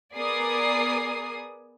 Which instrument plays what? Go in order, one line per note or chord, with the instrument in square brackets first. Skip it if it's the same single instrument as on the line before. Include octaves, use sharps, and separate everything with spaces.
[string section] B3 G#4 A#4 D5 D#6 C7